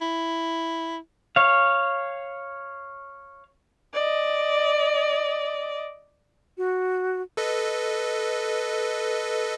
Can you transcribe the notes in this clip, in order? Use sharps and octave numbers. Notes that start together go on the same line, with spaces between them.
E4
C#5 F5
D5 D#5
F#4
A4 B4 D#5